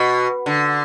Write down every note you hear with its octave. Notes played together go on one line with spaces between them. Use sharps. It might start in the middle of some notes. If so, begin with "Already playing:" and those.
Already playing: B2
D3